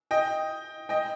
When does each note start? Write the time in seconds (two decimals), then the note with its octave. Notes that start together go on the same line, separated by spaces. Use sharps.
0.11 D#5 G5
0.89 D#5 G5